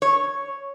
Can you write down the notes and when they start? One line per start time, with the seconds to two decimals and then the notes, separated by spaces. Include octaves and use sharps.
0.02 C#5